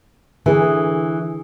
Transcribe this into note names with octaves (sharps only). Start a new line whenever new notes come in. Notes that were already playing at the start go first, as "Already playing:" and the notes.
D3 E3 G#4